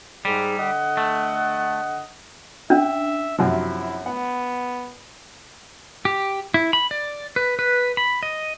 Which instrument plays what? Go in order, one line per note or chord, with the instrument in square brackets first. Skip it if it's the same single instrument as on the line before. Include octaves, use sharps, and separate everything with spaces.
[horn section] G#2 G#4 [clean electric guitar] G3
[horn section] D3 D#5 F#5
[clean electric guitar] A3
[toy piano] C#4 D4 [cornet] E5
[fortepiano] F#2 C3 F3 [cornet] E4
[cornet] B3 [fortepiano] F#5
[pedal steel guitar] G4
E4
B5
D5
B4
B4
B5
D#5